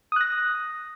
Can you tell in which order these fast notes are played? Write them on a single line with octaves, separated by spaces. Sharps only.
D#6 F#6 A#6